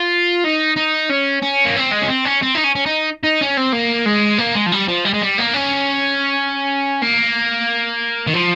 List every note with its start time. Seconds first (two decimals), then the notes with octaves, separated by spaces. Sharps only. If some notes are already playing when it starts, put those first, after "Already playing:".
Already playing: F4
0.45 D#4
0.77 D#4
1.10 C#4
1.43 C#4
1.65 A#3
1.77 C4
1.92 G#3
2.02 C#4
2.09 C4
2.25 C#4
2.42 C4
2.55 D#4
2.64 C#4
2.75 C#4
2.86 D#4
3.23 D#4
3.41 C#4
3.57 C4
3.73 A#3
4.06 G#3
4.38 A#3
4.55 G#3
4.66 F3
4.72 G3
4.88 F3
5.05 G3
5.13 G#3
5.22 G3
5.38 A#3
5.53 C#4
7.02 A#3
8.27 D#3
8.34 F3